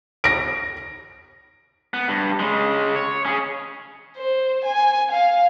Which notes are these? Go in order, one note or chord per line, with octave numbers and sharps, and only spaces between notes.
A#6 D7
B3
G2
C#3 G#3
C#5
C#4 G#4
C5
G#5
F5